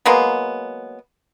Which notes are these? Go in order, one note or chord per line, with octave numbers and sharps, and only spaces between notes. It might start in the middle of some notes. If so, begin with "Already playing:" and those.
F#3 G#3 A#3 B3